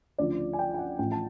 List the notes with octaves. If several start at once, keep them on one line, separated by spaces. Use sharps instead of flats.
D2 C#3 F3 D5
G#5
G5
G5
F#5
A1 A2 F3 G5
A5